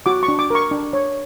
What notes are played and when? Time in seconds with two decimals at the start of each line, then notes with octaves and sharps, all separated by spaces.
0.06 F#4 D6
0.23 C#6
0.28 D4
0.39 D6
0.50 A#4 C#6
0.71 D4
0.93 C#5